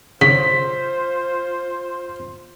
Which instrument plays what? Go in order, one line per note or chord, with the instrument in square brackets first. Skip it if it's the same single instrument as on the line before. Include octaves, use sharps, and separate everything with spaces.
[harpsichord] C#3 [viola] F4 C5 [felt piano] B6